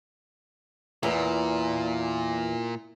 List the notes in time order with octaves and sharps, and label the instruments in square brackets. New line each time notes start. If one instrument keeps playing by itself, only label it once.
[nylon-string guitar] E2 [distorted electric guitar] A#2